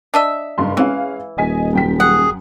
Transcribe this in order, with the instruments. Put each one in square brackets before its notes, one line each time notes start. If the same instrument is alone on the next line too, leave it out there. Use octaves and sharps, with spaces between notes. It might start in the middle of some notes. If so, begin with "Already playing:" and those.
[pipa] D4 D#5 E5
[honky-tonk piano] F#1 G2 C6
[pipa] E3 [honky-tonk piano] G#3 C#4 F5
[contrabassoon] D#1 [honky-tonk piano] D#5 G#5 B6
[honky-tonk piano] F#2 G5 B6
[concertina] G#4 [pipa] F#5